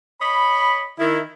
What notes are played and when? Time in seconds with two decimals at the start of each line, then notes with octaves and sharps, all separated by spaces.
0.21 C#5 D#5 B5
0.99 D#3 E4